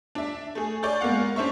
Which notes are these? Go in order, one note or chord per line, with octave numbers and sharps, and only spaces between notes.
D4 E5
A3 G#4
D5 G#5 C#6 G6 A6
G#3 A#3 B3 F5 F#5
C#4 D4 C5 E5 C#6